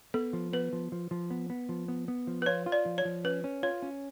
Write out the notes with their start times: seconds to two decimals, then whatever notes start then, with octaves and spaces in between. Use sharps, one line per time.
0.14 B3 A4
0.33 F3
0.53 B3 B4
0.73 F3
0.92 F3
1.11 F3
1.30 B3
1.50 B3
1.69 F3
1.88 B3
2.08 B3
2.27 F3
2.42 B4
2.46 F4 C#5
2.66 F4
2.72 D5
2.86 F3
2.98 C#5
3.05 F3
3.24 C#4 B4
3.44 C#4
3.63 F4 C#5
3.82 C#4